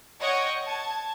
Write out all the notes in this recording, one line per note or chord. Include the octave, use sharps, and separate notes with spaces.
C#5 D#5 F#5 G5 C#6 G#6
A5 G#6